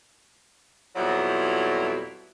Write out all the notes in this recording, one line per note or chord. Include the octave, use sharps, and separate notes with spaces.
F2 B2 F#3 G3 E4